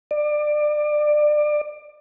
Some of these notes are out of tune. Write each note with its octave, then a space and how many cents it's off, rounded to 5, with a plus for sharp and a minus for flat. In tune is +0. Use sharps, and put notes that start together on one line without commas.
D5 +25